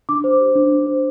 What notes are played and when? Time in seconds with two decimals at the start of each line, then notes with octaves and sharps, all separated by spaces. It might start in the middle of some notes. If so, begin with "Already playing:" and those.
0.09 D4 D6
0.24 C5
0.40 G4
0.55 D4
0.72 D4
0.87 C5